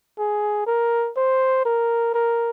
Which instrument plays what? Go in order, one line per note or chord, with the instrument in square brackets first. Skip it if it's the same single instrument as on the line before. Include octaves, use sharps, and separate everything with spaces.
[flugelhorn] G#4
A#4
C5
A#4
A#4